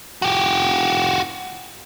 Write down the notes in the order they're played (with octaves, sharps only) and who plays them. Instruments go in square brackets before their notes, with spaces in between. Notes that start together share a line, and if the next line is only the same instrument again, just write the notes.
[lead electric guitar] F#4 G4